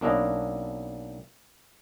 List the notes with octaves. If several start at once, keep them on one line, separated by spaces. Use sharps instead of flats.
B1 A#3 C#4 D4 E4 D#5